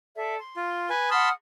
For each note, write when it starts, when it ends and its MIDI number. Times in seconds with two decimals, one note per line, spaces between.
0.15 0.35 69
0.15 0.35 74
0.15 0.35 76
0.41 0.93 84
0.57 0.89 65
0.90 1.10 71
0.90 1.10 80
1.11 1.30 78
1.11 1.29 81
1.11 1.29 83
1.11 1.29 84
1.11 1.30 87
1.11 1.30 89